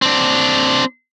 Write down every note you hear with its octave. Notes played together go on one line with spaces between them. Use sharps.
C4 D4